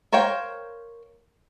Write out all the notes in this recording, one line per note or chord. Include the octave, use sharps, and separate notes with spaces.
A#4 C5 C#5 F5 G5